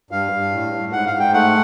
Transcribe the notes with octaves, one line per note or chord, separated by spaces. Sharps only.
G2 F5
G2
A2
A2
G#2 F#5
F5
G#2
G5
A3 F#5